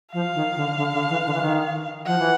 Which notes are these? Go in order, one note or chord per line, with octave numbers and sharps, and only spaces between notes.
F3 F5
D#3
D3
D3
D3
E3
D3
E3
D#3
F3 F#5
E3